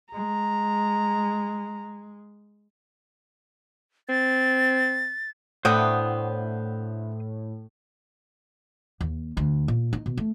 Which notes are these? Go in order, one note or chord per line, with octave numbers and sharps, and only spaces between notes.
G#3 A#5
C4 A6
A2 D3 B3 C5 G5 D#6
D#2
D2
A#2
D#4
B2
A3